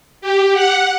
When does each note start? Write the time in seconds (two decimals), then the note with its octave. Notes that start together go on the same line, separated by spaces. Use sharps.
0.21 G4
0.53 F#5